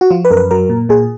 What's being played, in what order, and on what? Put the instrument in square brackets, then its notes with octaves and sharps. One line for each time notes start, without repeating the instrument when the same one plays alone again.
[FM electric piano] F#4
F3 F4
B4
F#2 A#4
B4
F#3 A#4
A#2
A#2 G#4